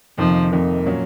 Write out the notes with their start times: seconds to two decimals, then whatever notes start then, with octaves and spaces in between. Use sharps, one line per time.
0.18 F2 C3 D#3 F3 A#3 D#4
0.52 F2 C3 D#3 A#3 D#4
0.86 A#2 F#3 C#4